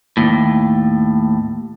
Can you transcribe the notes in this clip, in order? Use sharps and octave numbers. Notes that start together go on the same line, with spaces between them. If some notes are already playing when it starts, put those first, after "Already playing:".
D#2 A2